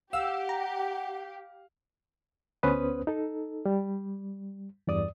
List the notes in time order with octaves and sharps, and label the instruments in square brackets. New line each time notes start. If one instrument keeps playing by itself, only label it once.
[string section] G4 [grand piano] F5 [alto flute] F#5 [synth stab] E6
[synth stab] A#5
[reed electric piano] D2 B3 C#4 B4 C5 D#6
D#4 A4
G3
E2 G2 D5 D#6